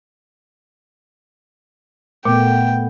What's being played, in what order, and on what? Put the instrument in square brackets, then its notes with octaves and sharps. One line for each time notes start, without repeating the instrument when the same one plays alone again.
[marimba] A#2 [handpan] A3 B3 [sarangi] G5